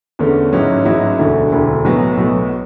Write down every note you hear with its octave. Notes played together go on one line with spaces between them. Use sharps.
E2 D3 A3 C#4
A1 G#2 F#3 C#4 E4
A1 G#2 F#3 C#4 E4
E1 D2 D3 A3 E4
E1 D2 D3 A3 E4
B1 A2 F#3 B3
B1 A2 F#3 B3